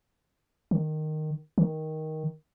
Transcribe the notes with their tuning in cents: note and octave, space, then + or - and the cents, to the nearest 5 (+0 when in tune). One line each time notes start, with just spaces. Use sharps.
D#3 -10
D#3 +10